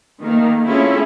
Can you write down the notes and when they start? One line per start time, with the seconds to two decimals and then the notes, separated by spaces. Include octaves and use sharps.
0.21 D#3 A3 A#3
0.65 A3 C4 C#4 E4 F4 G#4